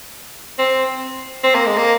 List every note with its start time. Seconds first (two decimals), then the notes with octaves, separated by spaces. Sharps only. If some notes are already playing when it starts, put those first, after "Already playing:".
0.59 C4
1.44 C4
1.55 A#3
1.66 G#3
1.77 A#3